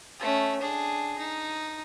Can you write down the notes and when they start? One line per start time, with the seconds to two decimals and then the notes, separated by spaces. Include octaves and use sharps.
0.20 A3 C#4
0.61 D4 G#4
1.18 D#4